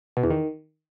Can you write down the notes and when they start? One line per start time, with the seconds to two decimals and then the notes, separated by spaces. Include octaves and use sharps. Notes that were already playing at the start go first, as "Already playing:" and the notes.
0.17 B2
0.24 E2
0.30 D#3